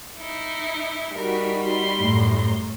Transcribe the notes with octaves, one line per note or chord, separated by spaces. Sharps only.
D#4 E4
G3 D#4 F#4 A#4 B6
C6
F#2 A2 A#5